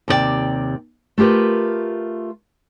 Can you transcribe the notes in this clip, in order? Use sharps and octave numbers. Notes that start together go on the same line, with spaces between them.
D#2 C3 D#4 D5 G5
A3 F4 G4 A#4 B4